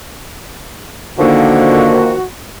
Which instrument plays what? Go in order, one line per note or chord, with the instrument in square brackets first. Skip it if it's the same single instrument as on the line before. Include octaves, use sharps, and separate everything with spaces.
[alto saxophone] D3 [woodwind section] D#3 F3 A#3 [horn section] F#4